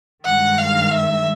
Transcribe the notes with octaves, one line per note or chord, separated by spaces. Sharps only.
G2 D#3 G#3 F#5
F5
E5